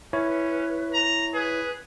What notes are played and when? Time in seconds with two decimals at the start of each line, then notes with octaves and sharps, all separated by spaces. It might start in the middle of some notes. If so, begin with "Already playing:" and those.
0.13 C#4 E4 B4 C#5
0.94 A#5
1.34 G#4 B4